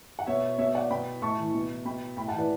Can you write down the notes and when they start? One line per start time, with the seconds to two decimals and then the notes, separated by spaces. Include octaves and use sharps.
0.19 F#5
0.27 B2 C#5 E5
0.58 B2 C#5 E5
0.75 D5 F#5
0.91 B2 G5 B5
1.22 A2 A5 C#6
1.38 E3
1.54 B2
1.85 B2 G5 B5
2.17 A2 G5 B5
2.28 F#5 A5
2.33 E3
2.38 B4 D5